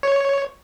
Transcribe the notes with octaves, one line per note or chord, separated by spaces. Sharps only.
C#5